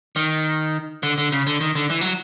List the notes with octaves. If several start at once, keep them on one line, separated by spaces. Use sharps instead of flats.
D#3
D3
D3
C#3
D3
D#3
D3
E3
F#3